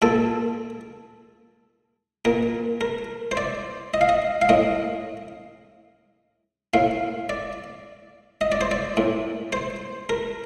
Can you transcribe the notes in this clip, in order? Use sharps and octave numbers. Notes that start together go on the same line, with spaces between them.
A#2 A4
A#2 A#4
A#4
C5
D5
D#5
F5
D#5
F5
A2 D#5
A2 F5
D5
D#5
D5
C5
D5
A2
C5
A#4